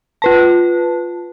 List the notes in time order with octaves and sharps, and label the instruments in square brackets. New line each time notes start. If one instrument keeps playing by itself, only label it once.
[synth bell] F4 B4 A5